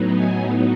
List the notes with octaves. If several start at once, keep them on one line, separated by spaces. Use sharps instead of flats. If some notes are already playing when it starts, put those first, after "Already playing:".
Already playing: A2 F#3 B3 D#4
G#5